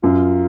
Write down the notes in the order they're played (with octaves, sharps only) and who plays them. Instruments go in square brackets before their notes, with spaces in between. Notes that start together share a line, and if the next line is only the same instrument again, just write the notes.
[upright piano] F#2 [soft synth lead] F4